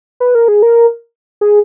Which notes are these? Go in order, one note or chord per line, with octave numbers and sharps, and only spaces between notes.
B4
A#4
G#4
A#4
G#4